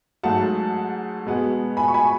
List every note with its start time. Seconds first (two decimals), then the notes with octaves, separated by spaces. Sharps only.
0.23 G#2 F#3 A3 F#5 A5
1.26 B2 G#3 B3
1.77 G#5 B5
1.88 C#6
1.94 G#5 B5